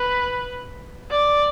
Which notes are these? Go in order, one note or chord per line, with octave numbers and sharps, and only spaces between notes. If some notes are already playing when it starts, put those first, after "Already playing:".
Already playing: B4
D5